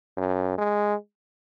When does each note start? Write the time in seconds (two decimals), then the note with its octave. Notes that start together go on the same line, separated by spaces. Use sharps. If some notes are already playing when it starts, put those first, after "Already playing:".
0.18 F#2
0.58 G#3